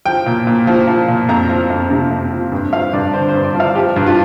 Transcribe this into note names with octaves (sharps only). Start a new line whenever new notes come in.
F3 G5
A#2
A#2
F3
F3
A#2
F2 A#5
F3
F2
C3
F2
F3
G2
F3 F5
G2 D5
D3 C5
C5
G2
D5
F3
F5
F3 G4
G2
F4